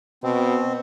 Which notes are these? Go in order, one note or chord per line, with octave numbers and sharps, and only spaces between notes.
B2 C4